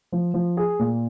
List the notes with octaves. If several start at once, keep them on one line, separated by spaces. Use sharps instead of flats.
F3
F3
G#4
A#2